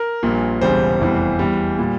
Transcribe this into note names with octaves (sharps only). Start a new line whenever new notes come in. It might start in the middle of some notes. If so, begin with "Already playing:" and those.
Already playing: A#4
A#1 A#2 G3
E1 E2 C#3 G3 C5
F1 E2 E3 G3
E2 E3 G3
A#2 G3